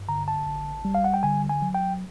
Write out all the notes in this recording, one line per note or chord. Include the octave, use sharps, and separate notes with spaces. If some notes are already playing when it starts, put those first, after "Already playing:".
Already playing: G2
D3 A#5
A5
G#1
G3
F5
F#5
G5
D3 G#5
G#5
F#3
G5